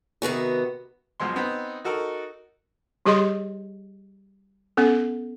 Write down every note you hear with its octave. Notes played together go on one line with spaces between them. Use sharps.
C3 D#3 B3 F#4
B1 F3 G#3 C6
B3 C4 D#4
D#4 F#4 A4 A#4
G3 G4 G#4 D#5 C6
B3 C#4 A4